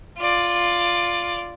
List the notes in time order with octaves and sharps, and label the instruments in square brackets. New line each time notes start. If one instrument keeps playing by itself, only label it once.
[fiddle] F4 D5